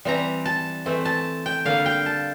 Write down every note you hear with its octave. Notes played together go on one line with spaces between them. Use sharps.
E3 G3 C4 A#5
A5
E3 A3 C4
A5
G5
D3 G3 A#3 F5
G5
A5